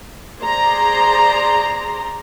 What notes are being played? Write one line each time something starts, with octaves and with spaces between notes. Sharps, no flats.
G#4 C5 D5 A#5 C6